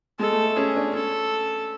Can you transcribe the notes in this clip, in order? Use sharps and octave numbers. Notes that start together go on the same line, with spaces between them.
G#3 A4
A3
A3
C#4 G#4
D4
C#4 A4